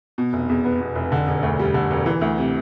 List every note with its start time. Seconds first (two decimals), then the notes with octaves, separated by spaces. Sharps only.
0.18 B2
0.33 F1
0.49 E2
0.65 B3
0.81 B2
0.95 F1
1.12 D3
1.28 E1
1.43 D2
1.59 G3
1.74 D3
1.91 E1
2.06 E3
2.21 D2
2.38 C3